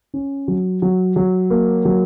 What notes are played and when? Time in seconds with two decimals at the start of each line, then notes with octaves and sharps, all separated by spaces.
0.14 C#4
0.48 F#3
0.82 F#3
1.16 F#3
1.50 A#3
1.85 F#3